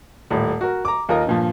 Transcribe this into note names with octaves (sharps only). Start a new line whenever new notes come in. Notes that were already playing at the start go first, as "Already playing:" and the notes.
D#1 A2
F#4 A#4
A#5 D6
D#2 F4 A#4 D#5
G2 A#2 F3